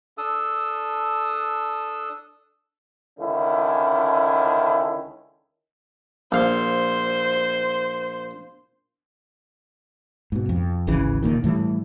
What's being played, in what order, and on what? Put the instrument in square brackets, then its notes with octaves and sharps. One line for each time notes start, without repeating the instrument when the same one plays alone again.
[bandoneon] D4 A4 D#6 E6
[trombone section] C#2 D3 D#3 C#4 E4
[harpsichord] A#1 F5 [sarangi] C5
[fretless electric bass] G#2 B2
F2
D1 G#1 C#3 E3
E1 B1 A#2 D#3
A2 E3 F#3 G3